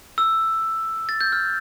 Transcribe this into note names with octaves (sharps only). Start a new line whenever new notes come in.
E6
A6
G6
F6